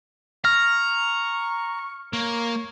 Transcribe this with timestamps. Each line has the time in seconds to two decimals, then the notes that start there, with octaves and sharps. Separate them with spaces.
0.45 A#5 C#6 F6
2.13 A#3 C#5